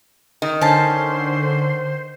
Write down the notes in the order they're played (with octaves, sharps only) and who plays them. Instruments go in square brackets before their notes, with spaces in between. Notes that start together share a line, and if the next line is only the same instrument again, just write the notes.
[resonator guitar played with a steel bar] D#3
[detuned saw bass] D3 [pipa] C#4 A5 [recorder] C5